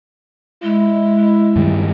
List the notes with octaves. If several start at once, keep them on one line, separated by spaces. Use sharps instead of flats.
G#3 E4
G2 D#3 G3